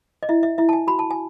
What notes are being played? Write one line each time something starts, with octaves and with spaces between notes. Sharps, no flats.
D#5
E4 E5
E5
E4 E5
A5
G#5
F#4 B5
A5
G#5